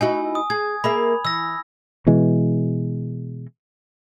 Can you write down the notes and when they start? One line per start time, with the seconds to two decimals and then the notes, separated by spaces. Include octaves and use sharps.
0.01 D#4 E4 F#4 G#5
0.35 D#6
0.50 G#4 G#6
0.84 A#3 G#4 E5 B5
1.25 E3 E6 A#6
2.07 B2 E3 G#3